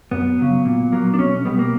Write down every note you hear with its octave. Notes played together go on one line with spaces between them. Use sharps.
F#2 B3
C#3 F#3
A#2
F#3 A#3
D4
B1 C#4
B2 G3 B3
A#3